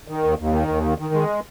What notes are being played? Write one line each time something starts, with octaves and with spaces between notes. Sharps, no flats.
D#3
D#2
D#2
D#3
D#2
D#3
D#3
G#3